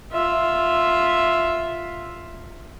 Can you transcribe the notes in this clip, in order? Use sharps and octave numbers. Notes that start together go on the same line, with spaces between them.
F4 E5